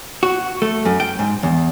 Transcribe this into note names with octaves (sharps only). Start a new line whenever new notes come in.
F#4
A3
F#2
G5
G#2
E2